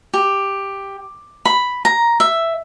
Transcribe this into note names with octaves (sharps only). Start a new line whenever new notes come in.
G4
B5
A#5
E5